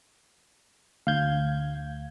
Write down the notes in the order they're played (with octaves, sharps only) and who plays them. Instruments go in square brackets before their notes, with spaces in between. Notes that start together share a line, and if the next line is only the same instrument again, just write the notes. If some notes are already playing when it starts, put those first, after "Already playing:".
[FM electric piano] D2 G#6 [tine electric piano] F5 G6